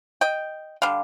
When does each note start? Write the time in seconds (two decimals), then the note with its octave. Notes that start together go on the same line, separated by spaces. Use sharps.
0.21 D#5 G5
0.82 D3 G3 F5